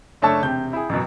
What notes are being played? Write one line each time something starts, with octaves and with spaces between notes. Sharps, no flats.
F#1 A3 D4 C#5 A5 E6
E1 C3 G5 G6
E4 G#4
A1 F#2 B2